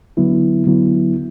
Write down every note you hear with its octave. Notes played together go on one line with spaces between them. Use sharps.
D3 F#3 B3 E4
D3 F#3 B3 E4